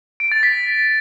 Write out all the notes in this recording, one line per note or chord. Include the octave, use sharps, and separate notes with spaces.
D7
A6
B6